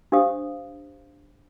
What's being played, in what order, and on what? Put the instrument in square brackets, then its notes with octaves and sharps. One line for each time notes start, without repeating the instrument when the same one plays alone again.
[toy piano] D4 G4 C5 F5 D#6